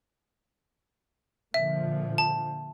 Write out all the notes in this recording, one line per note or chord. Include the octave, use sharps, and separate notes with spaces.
A#2 D3 F3 E5
A5